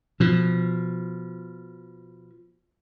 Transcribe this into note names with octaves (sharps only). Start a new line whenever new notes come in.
B2 F3